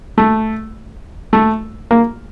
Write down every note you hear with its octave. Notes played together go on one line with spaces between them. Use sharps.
A3
A3
A#3